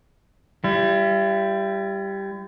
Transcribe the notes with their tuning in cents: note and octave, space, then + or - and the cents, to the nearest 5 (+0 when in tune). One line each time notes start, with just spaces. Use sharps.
G3 +0 E4 +45